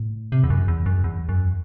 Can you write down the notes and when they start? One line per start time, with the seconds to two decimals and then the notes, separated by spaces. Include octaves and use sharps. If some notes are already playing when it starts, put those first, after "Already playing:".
Already playing: A2
0.32 C3
0.44 E2
0.50 F#2
0.68 E2
0.86 F#2
1.04 E2
1.29 F#2